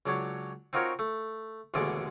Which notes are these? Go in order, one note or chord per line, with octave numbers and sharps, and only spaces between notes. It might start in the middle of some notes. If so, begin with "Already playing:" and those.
C#2 F#3 D4 C#5
C4 D#4 F4 F#4 A#4 C#5
A3
A1 D#2 B2 D3 G#3 D5